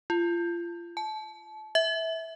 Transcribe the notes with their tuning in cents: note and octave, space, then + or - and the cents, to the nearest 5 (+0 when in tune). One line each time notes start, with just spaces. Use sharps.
F4 -30
A5 -30
E5 -15